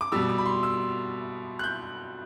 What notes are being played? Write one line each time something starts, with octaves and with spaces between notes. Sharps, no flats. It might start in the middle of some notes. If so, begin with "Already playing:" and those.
D6
B2 G3 E6
D6
B5
C6
E6
F#6
G6